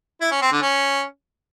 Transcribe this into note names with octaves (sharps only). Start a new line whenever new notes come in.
E4
C#4
C4
D3
C#4